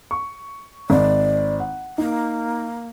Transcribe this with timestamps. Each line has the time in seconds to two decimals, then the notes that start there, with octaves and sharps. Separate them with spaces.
0.11 C#6
0.90 G#1 D5
1.60 F#5
1.98 A#3 D#4